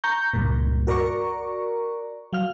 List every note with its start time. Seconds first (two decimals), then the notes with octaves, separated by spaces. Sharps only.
0.04 A#5 C#6 G6
0.34 C#2 G2 A#2
0.87 F#4 A#4 D5 A#5 C#6
2.33 F#3 F5 F6